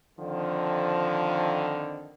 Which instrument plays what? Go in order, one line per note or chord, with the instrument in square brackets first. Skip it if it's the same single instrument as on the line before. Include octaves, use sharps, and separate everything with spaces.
[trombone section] F2 D3 D#3 [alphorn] F3